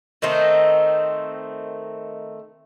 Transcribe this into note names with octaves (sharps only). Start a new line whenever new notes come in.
D#3 A3 C4 D#4